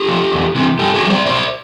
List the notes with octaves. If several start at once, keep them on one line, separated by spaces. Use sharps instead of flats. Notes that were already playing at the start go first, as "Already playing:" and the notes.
Already playing: G4 A4
F3
E2
C3 E3
G2 G4 A4
F#4 G#4
E3
G3 C5 D5
B2 C5 D5